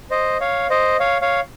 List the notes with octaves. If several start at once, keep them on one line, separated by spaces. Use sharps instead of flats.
C5 D#5
C#5 F5
C5 D#5
C#5 F5
C#5 F5